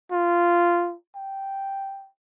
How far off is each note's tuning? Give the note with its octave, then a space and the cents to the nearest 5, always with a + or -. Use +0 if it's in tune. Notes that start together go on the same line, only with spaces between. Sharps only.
F4 -10
G5 -5